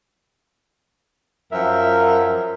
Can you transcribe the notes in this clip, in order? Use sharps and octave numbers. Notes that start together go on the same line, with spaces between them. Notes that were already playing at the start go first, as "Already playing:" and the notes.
F#2 F3 A#4 E5